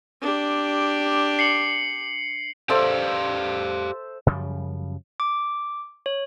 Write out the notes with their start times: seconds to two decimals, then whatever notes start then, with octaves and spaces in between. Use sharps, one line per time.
0.22 D4 G4
1.39 C7 C#7 F#7
2.69 G4 A4 C5 D5 E5 F5
4.26 F#2 C#3 F3 G3
5.20 D6
6.06 C#5